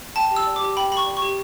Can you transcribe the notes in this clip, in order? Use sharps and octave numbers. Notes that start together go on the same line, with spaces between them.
G5 A5
G4
E6
D5
D6
G4
G5 B5
G4 B5
C#6
D5
C#6
G4